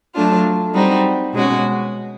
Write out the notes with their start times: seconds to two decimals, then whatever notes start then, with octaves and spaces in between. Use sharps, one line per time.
0.15 F#3 A3 D4 F4
0.74 G3 C4 D#4 F#4
1.34 B2 G#3 C#4 F#4